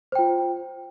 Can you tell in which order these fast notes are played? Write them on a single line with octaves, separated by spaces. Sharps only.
C5 G5 F4